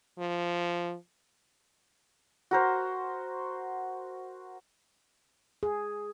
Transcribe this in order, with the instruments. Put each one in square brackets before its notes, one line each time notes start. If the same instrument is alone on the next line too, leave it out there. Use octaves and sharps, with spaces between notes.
[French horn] F3
[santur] F#4 A#4 C5
[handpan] G#4